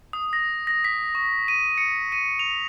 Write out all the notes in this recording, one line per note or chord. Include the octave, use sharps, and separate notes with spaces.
D#6
A#6
A#6
B6
C#6
D#7
C#7
D#7
F7